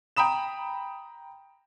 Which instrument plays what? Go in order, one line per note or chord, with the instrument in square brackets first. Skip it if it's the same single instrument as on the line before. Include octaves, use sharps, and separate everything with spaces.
[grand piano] G5 A#5 B5 D#6 E7